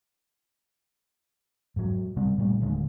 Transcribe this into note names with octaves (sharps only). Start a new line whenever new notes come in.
G#2 F#3
C3 G3 C4
A#2 G3 A3
D1 D#2 D3 G#3